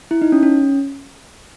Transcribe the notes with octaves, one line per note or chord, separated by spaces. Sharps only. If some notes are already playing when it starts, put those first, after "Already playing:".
E4
D#4
C#4
C#4